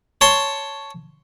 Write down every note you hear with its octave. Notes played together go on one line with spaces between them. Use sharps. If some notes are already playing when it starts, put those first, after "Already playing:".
C#5 A5 C6